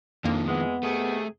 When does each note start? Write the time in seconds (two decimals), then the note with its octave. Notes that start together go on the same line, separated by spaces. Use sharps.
0.24 F2 D#3 F3 A#3 D4
0.47 E3 G#3 B3
0.83 C3 D#3 A3 G#4